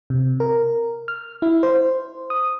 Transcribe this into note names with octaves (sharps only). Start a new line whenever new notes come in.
C3
A#4
F6
E4
C5
D#6